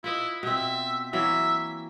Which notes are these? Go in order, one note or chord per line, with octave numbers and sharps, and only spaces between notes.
E4 F4 B4 D#5
B2 C4 E5
E3 F#3 A#3 E5